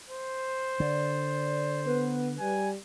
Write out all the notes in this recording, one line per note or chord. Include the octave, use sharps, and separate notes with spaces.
C5
D3 D5
B3 B4
G3 G#5